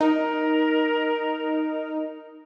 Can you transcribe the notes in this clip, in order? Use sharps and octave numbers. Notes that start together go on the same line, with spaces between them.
D#4 A#4